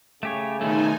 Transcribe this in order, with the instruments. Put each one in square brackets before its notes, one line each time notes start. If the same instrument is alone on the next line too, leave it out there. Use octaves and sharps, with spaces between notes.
[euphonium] C#3 [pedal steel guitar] A3 G4 C#5
[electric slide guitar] B2 D#3 A3 [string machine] D#4 G#5 [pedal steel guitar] A4